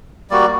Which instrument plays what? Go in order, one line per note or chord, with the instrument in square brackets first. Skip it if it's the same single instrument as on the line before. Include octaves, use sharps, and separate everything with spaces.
[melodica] G3 A#3 F#4 D5